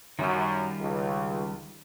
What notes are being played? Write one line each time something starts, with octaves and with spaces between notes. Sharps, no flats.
F#2 D#3 G3 F4
C#2